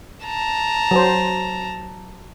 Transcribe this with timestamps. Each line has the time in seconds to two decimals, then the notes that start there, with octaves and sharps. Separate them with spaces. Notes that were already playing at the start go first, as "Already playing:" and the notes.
0.24 A5 A#5
0.91 F#3 C5